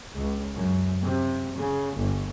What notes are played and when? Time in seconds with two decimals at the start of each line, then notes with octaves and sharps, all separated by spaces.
0.16 C#2
0.55 F#2
1.00 C3
1.55 C#3
1.94 G1